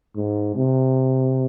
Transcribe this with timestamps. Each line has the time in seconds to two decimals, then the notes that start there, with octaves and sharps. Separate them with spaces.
0.16 G#2
0.56 C3